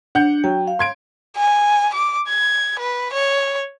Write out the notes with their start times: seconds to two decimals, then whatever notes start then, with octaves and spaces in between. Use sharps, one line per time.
0.15 D4 F#5 G6
0.44 F#3 G5
0.68 F5
0.79 C6 G#6 D7
1.37 G#5
1.94 D6
2.28 G#6
2.79 B4
3.13 C#5